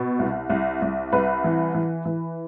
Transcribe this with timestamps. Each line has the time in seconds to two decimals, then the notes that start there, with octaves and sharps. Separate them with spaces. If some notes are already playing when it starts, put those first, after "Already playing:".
Already playing: B2
0.19 C2
0.50 C2
0.82 C2
1.12 C2 B4
1.44 E3
1.75 E3
2.05 E3